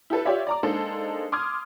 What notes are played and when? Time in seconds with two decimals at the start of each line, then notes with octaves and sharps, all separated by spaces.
0.10 E4 G4 A4 B4
0.25 F4 G4 C#5 D5 E5
0.47 D5 A#5 D6
0.63 G#3 A#3 D4 D#4 A4 C5
1.32 C6 D6 D#6 F6 G#6